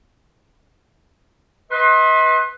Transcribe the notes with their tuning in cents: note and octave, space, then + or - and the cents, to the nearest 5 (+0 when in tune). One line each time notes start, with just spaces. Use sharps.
B4 +0 D#5 +35 C6 +35